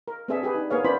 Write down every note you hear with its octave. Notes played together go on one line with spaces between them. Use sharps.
A#4
B3 C4 D4 G#4 A4 E5
G4 G#4 B4
D4 D#4
A#3 B3 G#4 C#5 F5
B3 C#4 E4 C5 D5 B5